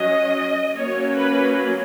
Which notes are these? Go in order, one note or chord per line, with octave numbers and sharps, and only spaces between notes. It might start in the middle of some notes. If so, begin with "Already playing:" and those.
Already playing: F#3 C#4 D#5
F#3 A#3 C#4 C#5
B4